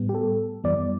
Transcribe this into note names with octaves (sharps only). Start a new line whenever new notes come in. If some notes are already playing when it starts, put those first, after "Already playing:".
Already playing: A2 G3 B3
G4
A4
F#2 E3 G3 B3 D5